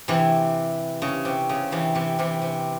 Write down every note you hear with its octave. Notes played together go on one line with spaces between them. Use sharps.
C3 E3
C#3
C3
C#3
C3 E3
C3 E3
C3 E3
C3